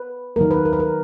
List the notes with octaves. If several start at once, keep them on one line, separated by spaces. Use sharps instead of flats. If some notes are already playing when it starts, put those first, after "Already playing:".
Already playing: B4
D#3 F#3 A#3 A#4
B4
A#4
B4
A#4